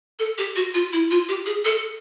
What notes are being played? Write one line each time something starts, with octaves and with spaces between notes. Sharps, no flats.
A4
G4
F#4
F4
E4
F4
G4
G#4
A4